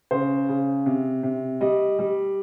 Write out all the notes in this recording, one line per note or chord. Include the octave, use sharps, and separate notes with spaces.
C#3 C5
C#3
C3
C3
G3 D#5
G3